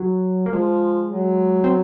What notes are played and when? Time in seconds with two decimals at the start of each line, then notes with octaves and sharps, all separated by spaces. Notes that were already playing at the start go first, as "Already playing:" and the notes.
Already playing: F#3
0.46 A#3
0.53 F3 G#3
1.13 F#3
1.64 C4